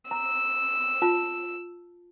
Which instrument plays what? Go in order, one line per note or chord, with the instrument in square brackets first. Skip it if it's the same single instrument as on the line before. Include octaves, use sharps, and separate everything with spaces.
[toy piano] A#5 [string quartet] E6
[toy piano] F4 A5